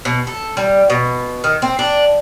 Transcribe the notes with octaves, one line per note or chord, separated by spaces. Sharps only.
B2
A4
G3
B2
D#3
C4
D4